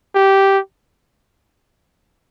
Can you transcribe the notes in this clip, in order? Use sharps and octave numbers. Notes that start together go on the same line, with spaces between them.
G4